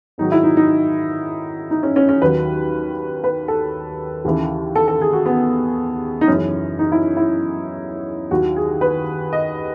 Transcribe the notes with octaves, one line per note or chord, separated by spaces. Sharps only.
G#2 D#3 F#3 D#4
E4
D#4
D#4
D#4
C#4
C#4
C#4
D#2 D#3 F#3 B4
B4
A4
D#2 C#3 E3
A4
A4
G#4
F#4
B3
D#4
F#2 C#3 E3 C#4
D#4
E4
E4
D#2 D#3 F#3 F#4
G#4
B4
D#5